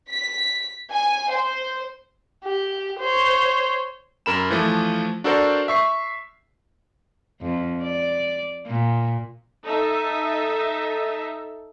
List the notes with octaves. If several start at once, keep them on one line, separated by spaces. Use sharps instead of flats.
B6
G#5
C5
G4
C5 C#5
F#2 A#4 B5 E7
E3 F3 A3
D4 F#4 A4 A#4 C5 D5
E5 C#6 C7
F2
D5
A#2
D#4 A4 E5